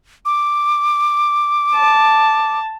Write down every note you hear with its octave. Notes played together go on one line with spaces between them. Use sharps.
D6
A5